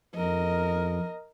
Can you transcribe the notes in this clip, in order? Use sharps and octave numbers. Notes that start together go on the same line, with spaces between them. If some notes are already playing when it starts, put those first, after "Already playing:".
F2 A#4 D#5